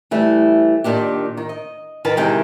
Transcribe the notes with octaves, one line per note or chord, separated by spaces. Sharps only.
E3 G3 A3
A#2 D#3 D4 G4
D#3
D#5
D#3 A#4 B4 A5
C3 D#3 E3 G#3 G4 G5